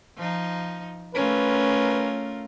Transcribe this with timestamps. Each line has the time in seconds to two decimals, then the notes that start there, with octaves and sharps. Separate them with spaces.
0.16 F3 D#4
1.15 A3 C#4 F4 A#4 B4